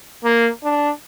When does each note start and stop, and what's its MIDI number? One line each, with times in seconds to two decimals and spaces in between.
0.24 0.49 58
0.64 0.90 62